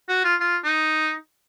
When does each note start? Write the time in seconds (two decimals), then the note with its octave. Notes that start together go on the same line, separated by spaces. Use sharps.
0.08 F#4
0.24 F4
0.40 F4
0.64 D#4